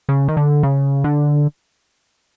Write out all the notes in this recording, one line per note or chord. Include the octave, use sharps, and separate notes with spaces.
C#3
D#3
D3
C#3
D3